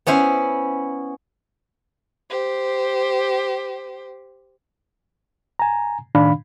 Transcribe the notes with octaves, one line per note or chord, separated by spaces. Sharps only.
B3 C#4 E4 C5
G4 C5
G#5 A#5
A2 D#3 D4 F5 B5